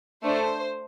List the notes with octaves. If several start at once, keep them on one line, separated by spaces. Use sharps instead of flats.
A3 D4 A4 C5